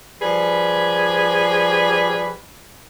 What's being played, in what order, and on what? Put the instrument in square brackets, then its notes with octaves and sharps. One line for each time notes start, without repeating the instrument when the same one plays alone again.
[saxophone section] F3 G3 G#4 B4